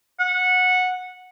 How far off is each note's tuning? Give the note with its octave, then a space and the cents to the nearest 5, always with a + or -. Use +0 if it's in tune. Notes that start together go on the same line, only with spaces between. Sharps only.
F#5 -15